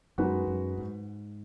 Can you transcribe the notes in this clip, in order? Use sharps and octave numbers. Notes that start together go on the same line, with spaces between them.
F#2 G#3 D#4 F#4 B4
F#2
G#2